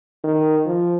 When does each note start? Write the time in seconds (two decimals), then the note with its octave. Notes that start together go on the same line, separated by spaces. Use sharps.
0.24 D#3
0.66 F3